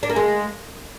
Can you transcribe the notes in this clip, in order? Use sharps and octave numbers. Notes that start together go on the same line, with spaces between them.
D4
A#3
G#3